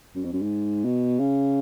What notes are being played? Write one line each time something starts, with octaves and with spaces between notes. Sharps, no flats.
F#2
F2
F#2
G#2
B2
C#3